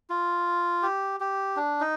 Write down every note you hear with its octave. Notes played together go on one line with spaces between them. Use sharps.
F4
G4
G4
D4
D#4